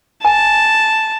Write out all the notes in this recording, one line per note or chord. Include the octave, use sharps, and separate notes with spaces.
G#5 A5